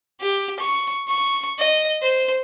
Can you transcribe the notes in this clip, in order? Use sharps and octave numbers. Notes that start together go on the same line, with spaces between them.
G4
C#6
C#6
D#5
C5